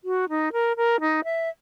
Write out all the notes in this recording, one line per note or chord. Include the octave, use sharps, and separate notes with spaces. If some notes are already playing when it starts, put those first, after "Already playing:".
F#4
D#4
A#4
A#4
D#4
E5